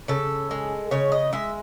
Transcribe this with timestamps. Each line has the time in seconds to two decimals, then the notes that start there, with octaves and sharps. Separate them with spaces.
0.08 C#3 A4
0.51 G#3
0.91 C#3 C#5
1.12 D#5
1.33 G#3 E5